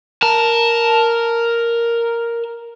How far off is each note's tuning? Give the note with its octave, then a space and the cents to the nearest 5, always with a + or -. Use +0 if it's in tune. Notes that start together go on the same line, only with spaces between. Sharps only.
A#4 +0 A5 +0